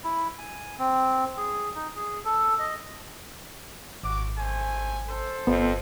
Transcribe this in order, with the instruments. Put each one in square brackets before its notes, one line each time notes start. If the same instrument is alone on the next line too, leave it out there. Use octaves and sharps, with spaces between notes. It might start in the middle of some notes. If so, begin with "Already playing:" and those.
[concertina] E4
G#5
C4
G#4
D#4
G#4
A4
D#5
[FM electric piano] G#1 [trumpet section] F#4 D6
[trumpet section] A3 C5 G#5
A4 C5
[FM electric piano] G1 [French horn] F2 [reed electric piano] B3